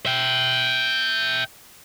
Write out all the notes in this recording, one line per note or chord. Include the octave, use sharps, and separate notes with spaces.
E5 G5